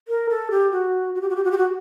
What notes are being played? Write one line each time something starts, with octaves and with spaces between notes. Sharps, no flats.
A#4
A4
G4
F#4
F#4
G4
F#4
G4
F#4
G4
F#4